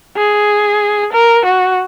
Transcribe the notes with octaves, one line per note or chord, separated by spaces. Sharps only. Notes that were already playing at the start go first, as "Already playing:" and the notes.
G#4
A#4
F#4